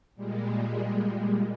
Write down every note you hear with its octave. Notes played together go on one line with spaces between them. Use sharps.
A#2 G3 G#3